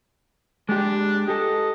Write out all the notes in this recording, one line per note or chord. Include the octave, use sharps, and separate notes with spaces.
G#3 D4 G4
G4 A4 D#5